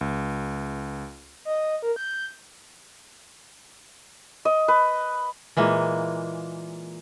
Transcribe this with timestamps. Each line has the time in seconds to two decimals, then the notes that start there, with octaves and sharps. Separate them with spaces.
0.01 C#2
1.45 D#5
1.82 A#4
1.96 G6
4.45 D#5
4.68 B4
5.57 A#2 E3 G#3 A#3